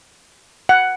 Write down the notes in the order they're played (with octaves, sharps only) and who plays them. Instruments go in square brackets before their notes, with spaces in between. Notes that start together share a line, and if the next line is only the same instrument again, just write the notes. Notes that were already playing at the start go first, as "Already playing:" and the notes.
[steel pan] F#5